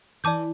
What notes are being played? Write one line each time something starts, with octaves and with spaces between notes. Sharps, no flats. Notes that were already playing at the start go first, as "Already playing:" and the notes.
E3 D5 A5 D6 G6